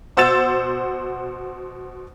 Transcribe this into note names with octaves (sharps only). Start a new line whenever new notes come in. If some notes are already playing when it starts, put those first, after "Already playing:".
B2 C5 F#5 E6 A6 E7